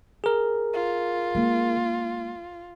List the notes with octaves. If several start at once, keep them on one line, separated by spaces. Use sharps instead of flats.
G#4 A#4
F4
G#3 A#3